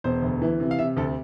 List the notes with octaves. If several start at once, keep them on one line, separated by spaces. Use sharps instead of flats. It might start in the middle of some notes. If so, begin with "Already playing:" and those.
E1 C5
D2
E3
C3
F5
C3 E5
D2 A4